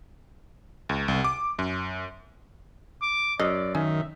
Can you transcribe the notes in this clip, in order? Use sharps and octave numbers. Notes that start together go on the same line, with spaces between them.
C#2
C2
D6
F#2
D6
F#2 D5 D#5
D#3 C#4 E5